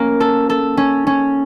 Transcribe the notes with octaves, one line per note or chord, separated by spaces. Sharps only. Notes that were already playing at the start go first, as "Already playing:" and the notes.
Already playing: A#3 C#4
A4
A4
C#4
C#4